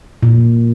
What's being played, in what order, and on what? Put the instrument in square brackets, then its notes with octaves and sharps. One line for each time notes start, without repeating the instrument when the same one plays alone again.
[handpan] A#2